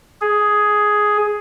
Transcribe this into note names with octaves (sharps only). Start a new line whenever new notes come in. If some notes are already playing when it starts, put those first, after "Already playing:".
G#4